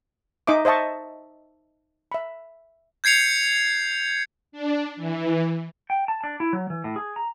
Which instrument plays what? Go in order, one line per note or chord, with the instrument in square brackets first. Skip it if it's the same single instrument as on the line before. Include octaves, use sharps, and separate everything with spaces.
[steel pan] D#4 D#5 E5 D6
C5 D#5 E5 A5 C#6
E5 B5
[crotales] G6 G#6 C7 C#7 F7
[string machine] D4
E3
[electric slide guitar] G5
A5
D4
E4
F#3
E3
A2
G#4
A#5